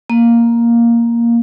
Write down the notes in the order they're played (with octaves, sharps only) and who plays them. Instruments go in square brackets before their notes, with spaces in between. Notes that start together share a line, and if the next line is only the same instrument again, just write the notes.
[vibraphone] A#3